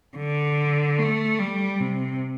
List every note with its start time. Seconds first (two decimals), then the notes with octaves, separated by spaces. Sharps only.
0.17 D3
0.99 A3
1.39 G3
1.80 C3